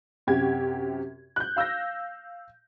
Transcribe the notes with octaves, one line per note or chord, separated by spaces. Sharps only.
F#2 C3 F#4 G4 G#6
F#6 G6
F5 E6 G6 A#6